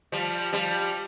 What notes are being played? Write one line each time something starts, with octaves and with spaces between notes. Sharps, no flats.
F3 G3
F3 G3